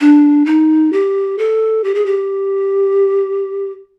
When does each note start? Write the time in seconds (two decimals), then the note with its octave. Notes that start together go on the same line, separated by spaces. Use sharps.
0.01 D4
0.46 D#4
0.93 G4
1.38 A4
1.84 G4
1.95 G#4
2.06 G4